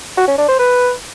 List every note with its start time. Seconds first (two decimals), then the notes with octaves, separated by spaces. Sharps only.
0.17 F#4
0.28 C#4
0.38 D4
0.49 C5
0.59 B4